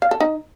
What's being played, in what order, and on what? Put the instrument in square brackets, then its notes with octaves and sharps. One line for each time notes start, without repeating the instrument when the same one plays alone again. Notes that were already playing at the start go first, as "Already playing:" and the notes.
[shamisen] F5
A4
D#4